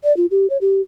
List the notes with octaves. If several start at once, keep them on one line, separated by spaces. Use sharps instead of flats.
D5
F4
G4
C#5
G4